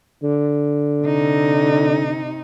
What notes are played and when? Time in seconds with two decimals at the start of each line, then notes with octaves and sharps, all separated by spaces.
0.23 D3
1.04 C3 D#4